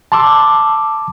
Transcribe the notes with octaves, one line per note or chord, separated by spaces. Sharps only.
A5 C6 D6 E6